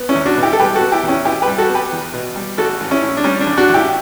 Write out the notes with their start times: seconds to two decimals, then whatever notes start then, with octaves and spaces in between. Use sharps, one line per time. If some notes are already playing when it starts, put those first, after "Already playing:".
Already playing: B3
0.09 C#4 E4
0.15 E2
0.26 D4 F#4
0.37 B2
0.43 E4 G4
0.53 A4
0.59 G3 G4 B4
0.75 F#4 A4
0.81 B3
0.92 E4 G4
1.03 E2
1.08 C#4 E4
1.25 B2 E4 G4
1.42 G4 B4
1.47 G3
1.58 F#4 A4
1.69 B3
1.75 G4 B4
1.92 E2
2.14 B2
2.36 G3
2.58 A1 F#4 A4
2.80 A1
2.91 C#4 E4
3.02 A2
3.17 D4
3.24 G3 C#4
3.40 D4
3.46 A1
3.57 D4 F#4
3.69 A1
3.74 E4 G4